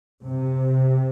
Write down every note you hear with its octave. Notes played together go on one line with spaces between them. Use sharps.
C3